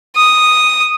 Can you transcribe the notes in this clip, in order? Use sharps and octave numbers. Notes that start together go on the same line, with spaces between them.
D#6